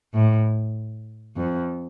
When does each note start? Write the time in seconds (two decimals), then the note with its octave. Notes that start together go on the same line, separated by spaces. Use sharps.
0.14 A2
1.36 F2